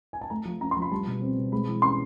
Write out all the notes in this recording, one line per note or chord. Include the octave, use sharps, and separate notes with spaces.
G#5
A5
A3 A#5
F3
C#4 A#5
C6
F3
B5
G3 A5
B2
C4
B2
G#3 B5
E3
C#4 C6